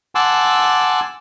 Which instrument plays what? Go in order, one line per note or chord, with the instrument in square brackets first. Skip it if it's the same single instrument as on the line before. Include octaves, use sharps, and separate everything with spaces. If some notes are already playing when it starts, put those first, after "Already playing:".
[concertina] F#5 G#5 A5 C6 D6 E6